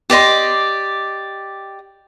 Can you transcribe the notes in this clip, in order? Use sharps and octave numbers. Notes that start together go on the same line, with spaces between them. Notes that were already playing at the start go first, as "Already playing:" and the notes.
G4 D5 D#5 C6